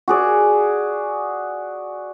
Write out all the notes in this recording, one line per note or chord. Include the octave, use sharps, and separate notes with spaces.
F#4 G#4 D5